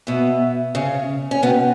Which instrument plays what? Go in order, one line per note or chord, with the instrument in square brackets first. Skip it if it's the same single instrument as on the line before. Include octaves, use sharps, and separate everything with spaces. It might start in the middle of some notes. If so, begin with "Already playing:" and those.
[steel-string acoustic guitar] B2 B3 [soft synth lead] E5
[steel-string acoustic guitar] C#3 C#4
C#4
[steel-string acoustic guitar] B2 B3 [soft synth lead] F#5
[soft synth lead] G5
F#5